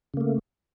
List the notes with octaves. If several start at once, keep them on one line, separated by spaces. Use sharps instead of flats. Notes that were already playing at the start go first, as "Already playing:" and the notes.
C#3 A3 A#3